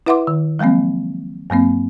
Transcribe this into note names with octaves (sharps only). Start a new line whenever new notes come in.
E4 B4 E5 F#5 C6 D6
D#3
F3 F#3 G#3 A#3 C4
G2 F#3 A#3 C4